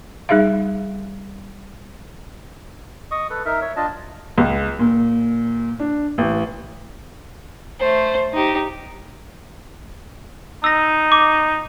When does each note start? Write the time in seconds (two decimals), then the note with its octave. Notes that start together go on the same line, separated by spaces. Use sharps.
0.29 G3 D#4 G#4 E5 F5
3.11 D#5 C#6 D#6
3.30 A4 B4
3.45 D#4 A#4 E5
3.61 C#5 E5
3.76 D4 F4 D#5 A5
4.38 C#2
4.79 A#2
5.79 D4
6.18 A1
7.80 A3 C5
8.33 D#4 G4
10.64 D#4 E6 A#6
11.12 D6